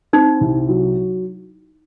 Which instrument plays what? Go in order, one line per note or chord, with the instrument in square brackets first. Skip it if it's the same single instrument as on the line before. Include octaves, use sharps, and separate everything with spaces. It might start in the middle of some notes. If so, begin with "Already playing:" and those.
[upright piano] C4 [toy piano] D#4
[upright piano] C2
F#3